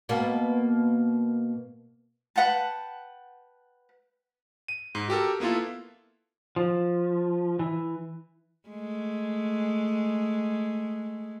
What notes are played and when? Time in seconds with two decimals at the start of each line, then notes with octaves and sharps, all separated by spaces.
0.09 B2 A#3 B3
2.36 B4 F#5 G5 A5
4.68 D#7
4.95 G#2
5.08 F#4 G4 A4 A#4
5.40 A#3 B3 E4 F4 A4
6.56 F3
7.59 E3
8.69 G#3 A3